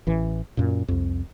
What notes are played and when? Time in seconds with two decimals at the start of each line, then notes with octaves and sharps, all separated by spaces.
0.07 A1 E3
0.57 F#2 A#2
0.88 C2 F2